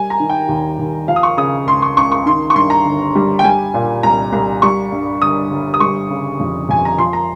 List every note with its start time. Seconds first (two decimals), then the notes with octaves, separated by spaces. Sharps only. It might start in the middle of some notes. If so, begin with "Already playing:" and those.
Already playing: G3 G#5
0.10 A#5
0.20 D#3
0.30 G5
0.48 D#2
0.79 D#2
1.08 F3 F5
1.16 D#6
1.23 C#6
1.37 C#3 D#6
1.67 C#2 C6
1.82 C#6
1.97 C#2 C#6
2.12 C#6
2.26 D#3 C6
2.50 C#6
2.55 G2 C6
2.70 A#5
2.85 G1
3.15 G3
3.39 G5
3.44 G3 G#5
3.74 A#2
4.03 C2 A#5
4.33 C2
4.62 G3 C#6
4.92 G2
5.22 G1 D#6
5.50 G1
5.74 D#6
5.80 G3 C#6
6.10 C#3
6.40 F2
6.69 F2 G#5
6.85 A#5
6.98 F3 C6
7.13 A#5